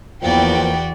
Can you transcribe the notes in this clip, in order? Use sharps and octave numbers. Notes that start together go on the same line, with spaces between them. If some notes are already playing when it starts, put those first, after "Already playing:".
E2 F3 A#3 F#4 B4 D5 G5